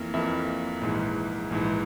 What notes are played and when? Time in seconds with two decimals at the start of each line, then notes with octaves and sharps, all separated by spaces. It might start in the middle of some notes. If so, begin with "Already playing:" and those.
Already playing: F2 E3 A#3 A#4
0.14 F2 E3 A#3 E5
0.82 A#1 G#2 E3
1.51 A#1 G#2 E3